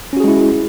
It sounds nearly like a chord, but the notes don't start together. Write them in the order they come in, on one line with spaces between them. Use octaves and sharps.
C#4 F#4 G#4 G#3 E4